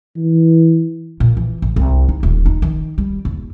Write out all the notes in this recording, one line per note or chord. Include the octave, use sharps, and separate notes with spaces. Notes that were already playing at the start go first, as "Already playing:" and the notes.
E3
A#2
E3
A1
C2
D#4
D#1
D#4
D#3
G3
D#2